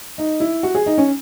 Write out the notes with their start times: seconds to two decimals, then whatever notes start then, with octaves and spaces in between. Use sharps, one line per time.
0.18 D#4
0.40 E4
0.63 F#4
0.75 G#4
0.86 D#4
0.98 C#4